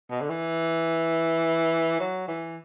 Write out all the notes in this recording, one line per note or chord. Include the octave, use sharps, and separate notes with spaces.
B2
D3
E3
F#3
E3